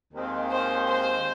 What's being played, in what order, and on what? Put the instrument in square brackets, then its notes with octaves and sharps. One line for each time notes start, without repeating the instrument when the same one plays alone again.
[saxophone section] D#2 D#3 G#3 C4 F4
[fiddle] C5
C5